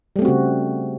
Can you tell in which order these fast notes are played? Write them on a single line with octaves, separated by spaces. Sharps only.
G3 A3 C4 F#4 C#3